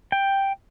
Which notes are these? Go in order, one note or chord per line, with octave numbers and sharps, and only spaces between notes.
G5